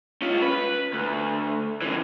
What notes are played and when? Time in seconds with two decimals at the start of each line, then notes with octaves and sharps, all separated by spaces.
0.22 C#4 F4
0.42 B4
0.93 D2
1.82 C#3 E3